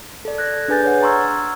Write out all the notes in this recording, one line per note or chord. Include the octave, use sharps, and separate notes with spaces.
A4 D5
F#6 G#6 A#6
D4 G#4 B4 G#5 G6 A6
C#5 F#5
A#5 C6 C#6 E6 F6 G#6